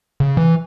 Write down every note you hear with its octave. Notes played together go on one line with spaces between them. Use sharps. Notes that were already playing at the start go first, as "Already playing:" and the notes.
C#3
E3